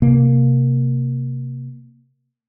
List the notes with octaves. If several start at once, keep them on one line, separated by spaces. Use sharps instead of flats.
C3 A#3